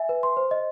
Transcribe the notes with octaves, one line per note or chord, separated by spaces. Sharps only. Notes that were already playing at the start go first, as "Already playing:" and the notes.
Already playing: E5 G#5
B4
C6
C5
D#5